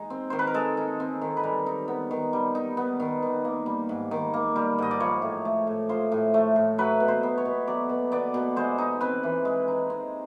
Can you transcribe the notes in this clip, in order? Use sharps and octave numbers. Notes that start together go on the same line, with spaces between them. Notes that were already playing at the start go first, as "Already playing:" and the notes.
Already playing: G#3 D#4
C4
D#3 C5
B4
A#4
G#3 A4
D#4
C4
D#3
B4
G3 A#4
D#4
B3
D#3
G3
D#4
B3
D#3
D#3
A#3
G3
G#2
D#3
A#3
G3
G#2 D#5
D5
F3 C#5
A2
A3
A2
F3 C5
A2
A3
A2
F#3 B4
B2
C5
B3
C#5
B2
F#3 D5
B2
B3 D5
B2
G#3 C5
D#4
C4 B4
E3
G#3
D#4
C4